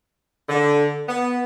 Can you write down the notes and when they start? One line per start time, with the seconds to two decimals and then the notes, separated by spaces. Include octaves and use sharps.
0.49 D3
1.08 B3